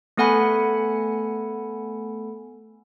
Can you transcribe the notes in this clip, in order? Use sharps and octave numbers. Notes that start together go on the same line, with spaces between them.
A3 B3 A4 F#5 G#5 B5